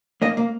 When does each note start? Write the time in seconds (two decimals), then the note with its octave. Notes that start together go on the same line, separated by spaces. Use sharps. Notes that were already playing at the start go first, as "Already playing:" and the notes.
0.22 A#3 D#5
0.37 A#3